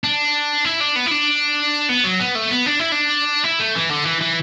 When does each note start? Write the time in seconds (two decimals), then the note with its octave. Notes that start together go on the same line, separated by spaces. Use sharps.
0.04 D4
0.65 E4
0.81 D4
0.96 B3
1.06 E4
1.11 D4
1.89 B3
2.04 F#3
2.20 B3
2.35 A3
2.51 B3
2.66 D4
2.79 E4
2.92 D4
3.44 E4
3.59 A3
3.75 E3
3.90 D3
4.05 E3
4.21 E3